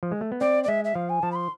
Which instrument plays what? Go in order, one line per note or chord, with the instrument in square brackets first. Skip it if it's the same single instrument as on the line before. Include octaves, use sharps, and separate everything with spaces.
[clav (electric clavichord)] F3
G#3
A3
B3
[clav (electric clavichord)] C4 [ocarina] D5
[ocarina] D5
[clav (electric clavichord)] G#3 [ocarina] E5
[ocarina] E5
[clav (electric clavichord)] F3 [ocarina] F5
[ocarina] G#5
[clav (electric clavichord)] F3 [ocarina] A5
[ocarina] B5
C6